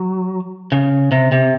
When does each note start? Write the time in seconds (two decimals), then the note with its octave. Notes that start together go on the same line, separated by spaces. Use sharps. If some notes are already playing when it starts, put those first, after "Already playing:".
Already playing: F#3
0.72 C#3
1.12 C3
1.32 C3